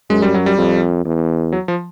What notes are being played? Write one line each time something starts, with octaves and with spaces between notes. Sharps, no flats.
F#2 G#3
G3
F#3
G3
F2
E2
F#3
F3